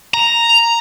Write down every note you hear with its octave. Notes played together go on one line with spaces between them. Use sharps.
A#5